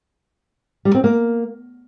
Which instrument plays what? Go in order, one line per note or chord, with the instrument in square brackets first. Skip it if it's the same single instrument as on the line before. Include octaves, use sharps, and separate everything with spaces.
[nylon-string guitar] G3
C4
A#3